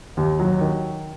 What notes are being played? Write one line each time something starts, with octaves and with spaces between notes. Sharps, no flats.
D#2
F#3
D#3